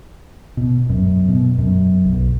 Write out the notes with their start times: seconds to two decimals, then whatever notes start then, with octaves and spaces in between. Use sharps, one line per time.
0.57 B2
0.89 F#2
1.28 B2
1.58 F#2
2.05 B1